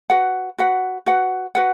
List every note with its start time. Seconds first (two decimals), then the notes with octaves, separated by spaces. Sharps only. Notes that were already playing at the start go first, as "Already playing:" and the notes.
0.10 F#4 B4 F#5
0.58 F#4 B4 F#5
1.06 F#4 B4 F#5
1.55 F#4 B4 F#5